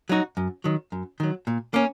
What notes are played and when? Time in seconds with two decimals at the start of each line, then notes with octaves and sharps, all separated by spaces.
0.09 F#3 D#4 F#4
0.37 F#2
0.64 D#3 F#3
0.92 F#2
1.20 D#3 F#3
1.47 A#2
1.74 A#3 C#4